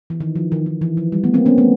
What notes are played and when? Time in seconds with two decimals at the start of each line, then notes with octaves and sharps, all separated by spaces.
0.10 E3
0.20 D#3
0.36 F3
0.52 D#3
0.66 D#3
0.81 E3
0.97 F3
1.12 G3
1.24 A3 B3
1.34 A#3 C4
1.46 B3 C#4
1.58 A3 B3